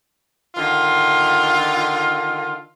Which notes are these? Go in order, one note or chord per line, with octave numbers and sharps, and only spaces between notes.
D3 D#3 F4